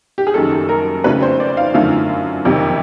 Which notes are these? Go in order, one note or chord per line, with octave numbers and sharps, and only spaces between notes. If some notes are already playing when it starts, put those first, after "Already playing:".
G4
G#4
F#1 F#2 D#3 G3 A4
A#4
F2 C#3 F#3 A3 B4
C5
D5
F5
F#2 D3 F3 A3 F5
F#1 F2 C3 D#3 G3